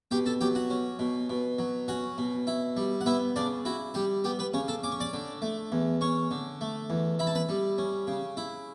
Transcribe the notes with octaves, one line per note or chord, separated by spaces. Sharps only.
B2 G4 G5
A4 A5
F#3 G4 G5
F#4 F#5
C#4
B2
B2
F#3
C#4 F#4 F#5
B2
E4
G3
F#5
B3 E4 E5
C#3 D4 D5
E4 F#4
G3 G4
B3 G4
B3 B4
C#3 C#4 C#5
A4 A5
C#4 D6
C#6
D5 D6
D3
A3
E2
C#4 C#5 C#6
D3
A3
E2
E4 B5
A5
B4 B5
G3
C#4
C#3
E4